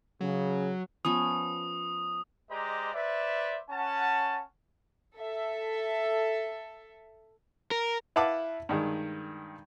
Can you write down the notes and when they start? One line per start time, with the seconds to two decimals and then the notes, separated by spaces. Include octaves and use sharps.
0.21 C#3 F#3
1.05 F3 B3 C#4 D#6
2.50 G#3 G4 C5 D5 D#5 A#5
2.94 B4 C5 D5 E5
3.70 C#4 F#5 A5
5.17 A4 E5
7.71 A#4
8.16 E4 B4 F5 F#5 A5 D6
8.69 G2 D#3 G#3